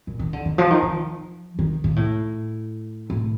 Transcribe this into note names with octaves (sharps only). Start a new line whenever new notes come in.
A#2
D#3
D3
D#3
F3
D#3
F3
D#3
A#2
A2
A2